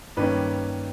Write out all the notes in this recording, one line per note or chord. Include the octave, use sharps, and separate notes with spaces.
G2 D#3 G3 A#3 C#4 B4